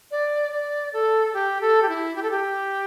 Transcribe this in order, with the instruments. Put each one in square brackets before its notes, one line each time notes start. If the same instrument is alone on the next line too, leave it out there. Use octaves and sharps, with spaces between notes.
[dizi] D5
D5
A4
G4
A4
G4
E4
G4
A4
G4